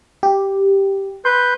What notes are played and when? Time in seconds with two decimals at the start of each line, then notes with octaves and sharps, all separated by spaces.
0.23 G4
1.25 B4 C6 G6